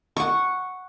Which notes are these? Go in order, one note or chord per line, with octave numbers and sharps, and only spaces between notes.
F#5 C#6